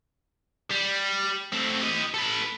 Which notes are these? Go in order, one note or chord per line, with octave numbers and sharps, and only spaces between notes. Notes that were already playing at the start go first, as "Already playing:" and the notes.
G3
A3 C4
G4 D#5
A4 B4